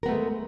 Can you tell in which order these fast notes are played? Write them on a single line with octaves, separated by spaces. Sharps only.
A#4 B3 A3 G#3